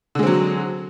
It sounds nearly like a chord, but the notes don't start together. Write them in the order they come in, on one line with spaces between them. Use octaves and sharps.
D3 G#3 C4 F#3